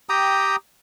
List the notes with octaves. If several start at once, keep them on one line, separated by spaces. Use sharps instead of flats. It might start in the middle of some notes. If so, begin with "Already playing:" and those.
G4 G5 A#5 D#6